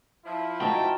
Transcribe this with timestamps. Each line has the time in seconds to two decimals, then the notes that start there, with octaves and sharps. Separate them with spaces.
0.24 F3 E4
0.61 D#4 F#4 G5 A5